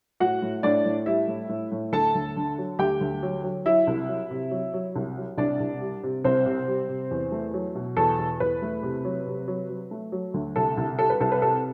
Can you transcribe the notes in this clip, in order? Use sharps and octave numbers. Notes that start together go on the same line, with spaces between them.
A2 F#4 F#5
A2
A2 D4 D5
A2
G3 E4 E5
A2
A2
A2
D2 A4 A5
D2
D3
F#3
D2 G4 G5
D2
F#3
F#3
F#3 E4 E5
C2
F#3
C3
F#3
F#3
C2
F#3
C2 D4 D5
C2
G3
C3
C2 C4 C5
C3
G3
C3
E2
A3
F#3
B2
E2 A4
E2
E2 B4
A3
C3
F#3
C3
F#3
F#3
A3
F#3
D2
C2 A4
C2
G3 A4
B4
C2 A4
B4
C3 A4